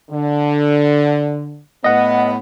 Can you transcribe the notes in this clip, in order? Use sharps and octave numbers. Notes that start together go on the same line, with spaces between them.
D3
A2 B3 D#5 F#5